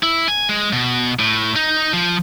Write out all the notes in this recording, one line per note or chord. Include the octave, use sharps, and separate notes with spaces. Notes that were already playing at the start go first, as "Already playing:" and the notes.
E4
G#5
G#3
B2
A2
D#4
F3